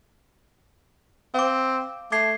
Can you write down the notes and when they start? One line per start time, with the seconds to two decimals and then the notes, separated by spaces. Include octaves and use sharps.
1.34 C4 F5 D6
2.12 A3 D6 G#6 C7